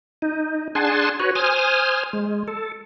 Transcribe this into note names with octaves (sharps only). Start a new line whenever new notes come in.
D#4
D4 G#4 F#5 G#5 A5 C6
F#4 B4 C#5
C5 G#5 D#6 F6
G#3
A4